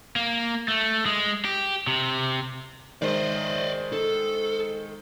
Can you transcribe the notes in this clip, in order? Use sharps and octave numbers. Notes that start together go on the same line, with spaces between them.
A#3
A3
G#3
G4
C3
D#3 G#3 C5 D5 D#5
A4